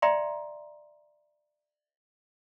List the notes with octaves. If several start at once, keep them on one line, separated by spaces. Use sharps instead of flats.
D5 E5 G5 A#5 C6